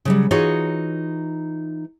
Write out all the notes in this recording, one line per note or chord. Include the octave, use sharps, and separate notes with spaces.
C#3 F#3 G3
E3 D#4 F4 F#4 G#4 C#5